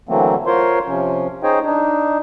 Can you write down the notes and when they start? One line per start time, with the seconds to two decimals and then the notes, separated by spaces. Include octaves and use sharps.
0.09 D3 E3 F#3 A3 A#3 C4
0.46 F4 A#4 C5 C#5 C6
0.87 C3 F3 C#4
1.43 D#4 G#4 C5 C#5 D#5 G5
1.65 D4 D#4